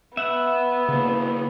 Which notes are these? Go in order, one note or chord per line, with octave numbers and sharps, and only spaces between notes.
B3 E5 F#5
C#3 A#3